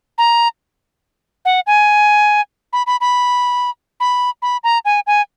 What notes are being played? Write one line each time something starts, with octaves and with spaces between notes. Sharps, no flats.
A#5
F#5
G#5
B5
B5
B5
B5
B5
A#5
G#5
G#5